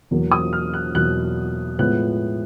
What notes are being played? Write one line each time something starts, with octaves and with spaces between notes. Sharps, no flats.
E2 B2 F#3 A#3
D#6
F6
F#6
E2 B2 F#3 A#3 F#6
A2 F3 G#3 B3 F#6